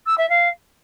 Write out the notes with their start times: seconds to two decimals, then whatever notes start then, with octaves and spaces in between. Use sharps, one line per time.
0.06 E6
0.17 E5
0.29 F5